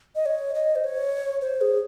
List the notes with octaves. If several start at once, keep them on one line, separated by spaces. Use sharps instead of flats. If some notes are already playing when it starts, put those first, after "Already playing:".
D#5
C#5
D#5
C5
C#5
C5
G#4